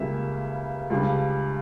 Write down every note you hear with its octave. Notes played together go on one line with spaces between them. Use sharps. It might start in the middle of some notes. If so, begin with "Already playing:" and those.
Already playing: C#2 C#3 G3 A#3 E5
C#2 C#3 G3 D4